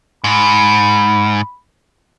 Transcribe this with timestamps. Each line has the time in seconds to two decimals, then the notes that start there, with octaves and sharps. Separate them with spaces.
0.24 G#2 B5